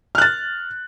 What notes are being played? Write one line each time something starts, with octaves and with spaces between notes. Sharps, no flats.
F6 F#6 A6